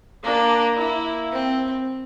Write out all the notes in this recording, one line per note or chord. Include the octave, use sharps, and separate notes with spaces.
A#3 D4
A#3 E4
C4